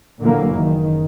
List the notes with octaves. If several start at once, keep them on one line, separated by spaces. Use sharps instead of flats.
A#2 D3 E3 F#3 A#3
F#1 D#3